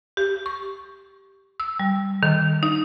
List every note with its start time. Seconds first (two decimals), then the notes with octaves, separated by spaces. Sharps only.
0.17 G4
0.46 C#6
1.60 E6
1.80 G3
2.23 D#3
2.63 D#4